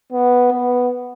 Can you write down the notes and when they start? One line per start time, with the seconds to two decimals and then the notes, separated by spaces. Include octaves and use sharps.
0.12 B3
0.52 B3